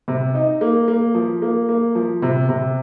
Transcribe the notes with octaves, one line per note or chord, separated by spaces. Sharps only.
C3
D#4
A#3
A#3
F3
A#3
A#3
F3
C3
C3